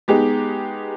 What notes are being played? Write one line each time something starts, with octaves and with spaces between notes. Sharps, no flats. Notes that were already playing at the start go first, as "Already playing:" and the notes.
G#3 B3 D#4 G4